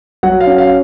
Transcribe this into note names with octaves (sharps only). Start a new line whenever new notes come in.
F#3 F#5
F5
C#4
F5